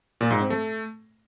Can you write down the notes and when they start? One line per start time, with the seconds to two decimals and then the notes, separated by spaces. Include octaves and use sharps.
0.21 A#2
0.31 G#2
0.40 C4
0.50 A3